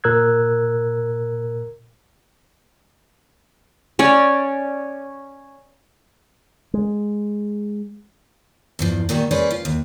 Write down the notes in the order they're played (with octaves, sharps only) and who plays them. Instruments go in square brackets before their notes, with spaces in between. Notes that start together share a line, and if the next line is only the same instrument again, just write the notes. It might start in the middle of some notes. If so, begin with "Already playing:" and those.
[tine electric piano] A#2 A#4 E6 F#6 G#6
[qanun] C#4 C#5 D5
[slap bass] G#3
[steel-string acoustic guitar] E2 G2 F3
A#2 D#3 G3 F#4
C#4 G#4 B4 C5 D5
F4
D#2